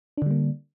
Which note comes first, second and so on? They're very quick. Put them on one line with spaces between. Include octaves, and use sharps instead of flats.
D4 D3 G3 A#3